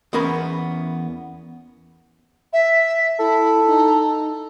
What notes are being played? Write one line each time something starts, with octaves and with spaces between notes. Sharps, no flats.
E2 B3 C#4 A#4 B5
E5
E4 A4
D#4